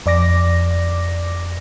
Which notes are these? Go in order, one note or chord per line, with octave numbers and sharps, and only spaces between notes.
F2 D5 D6 A#6